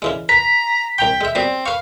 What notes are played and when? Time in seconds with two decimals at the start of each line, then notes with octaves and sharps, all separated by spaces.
0.02 C#3 E3 G#3
0.29 B4 A#5 B6
0.98 C2 G5 A#5 C6
1.21 G#3 E5
1.35 G3 B3 C4 F#4
1.66 B4 F5 C#6